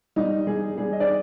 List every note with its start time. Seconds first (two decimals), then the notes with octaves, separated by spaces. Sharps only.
0.16 G3 D#4 D#5
0.47 G3 G#4
0.78 G3 G#4
0.93 D#5
1.00 D5